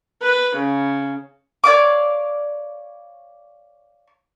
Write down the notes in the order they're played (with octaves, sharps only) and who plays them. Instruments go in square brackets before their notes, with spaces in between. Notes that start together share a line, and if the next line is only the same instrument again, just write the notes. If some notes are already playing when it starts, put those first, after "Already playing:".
[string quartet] B4
C#3
[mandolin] C#5 D5 F5 D6